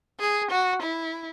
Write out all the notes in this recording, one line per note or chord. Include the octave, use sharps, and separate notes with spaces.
G#4
F#4
E4